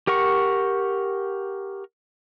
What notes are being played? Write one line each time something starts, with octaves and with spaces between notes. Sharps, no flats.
G4 A#4 F#5 C#6